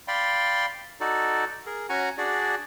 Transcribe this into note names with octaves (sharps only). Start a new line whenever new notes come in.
D5 F5 G5 B5 C6
D#4 F#4 A4 D5
G#4 A#4
C#4 F#4 F#5 G#5 A#5
D4 F#4 G#4 D5